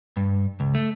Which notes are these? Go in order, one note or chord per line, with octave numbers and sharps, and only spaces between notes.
G2
C#2
A3